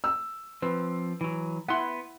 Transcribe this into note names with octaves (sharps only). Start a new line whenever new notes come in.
E6
F3 C4 B4
E3 F#3
B3 E4 F#5 C6